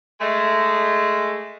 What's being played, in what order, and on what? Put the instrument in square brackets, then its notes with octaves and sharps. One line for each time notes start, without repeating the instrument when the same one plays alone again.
[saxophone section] G#3 A3